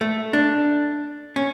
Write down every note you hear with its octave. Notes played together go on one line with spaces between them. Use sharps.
A3
D4
C#4